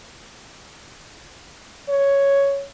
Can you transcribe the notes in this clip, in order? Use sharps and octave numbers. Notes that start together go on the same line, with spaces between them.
C#5